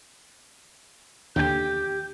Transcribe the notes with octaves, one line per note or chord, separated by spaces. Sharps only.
D#2 D3 G4 G5 G6